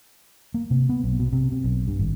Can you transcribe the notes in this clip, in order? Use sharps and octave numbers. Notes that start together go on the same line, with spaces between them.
A#3
C3
B3
B1
B2
C3
C3
B1
G2
G#1